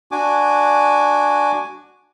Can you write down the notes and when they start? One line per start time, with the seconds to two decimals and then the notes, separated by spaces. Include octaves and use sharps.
0.12 D4 F#4 G#5 D6